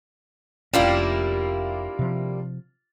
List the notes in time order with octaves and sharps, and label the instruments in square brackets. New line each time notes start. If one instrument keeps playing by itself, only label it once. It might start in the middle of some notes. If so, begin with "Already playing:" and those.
[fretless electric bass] F1 C#4 [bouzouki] G3 A#3 E4 [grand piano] D4 F4
[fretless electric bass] C3 F3